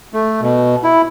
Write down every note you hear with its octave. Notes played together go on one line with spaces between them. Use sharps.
A3
B2
E4